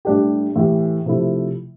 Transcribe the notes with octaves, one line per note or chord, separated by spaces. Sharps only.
A2 G3 D4 G4
A2 E3 A3 E4 G4
C3 F3 A3 E4